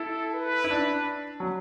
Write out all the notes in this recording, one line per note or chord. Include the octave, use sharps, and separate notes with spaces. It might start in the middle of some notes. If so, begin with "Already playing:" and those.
Already playing: E4 A4
B4
E4
D4
F#3